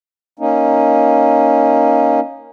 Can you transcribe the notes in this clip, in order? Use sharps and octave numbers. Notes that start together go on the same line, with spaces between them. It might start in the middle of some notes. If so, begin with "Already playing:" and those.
A#3 C#4 D#4